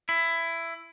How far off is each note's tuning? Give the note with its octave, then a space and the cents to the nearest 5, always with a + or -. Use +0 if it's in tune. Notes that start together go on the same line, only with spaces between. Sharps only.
E4 +15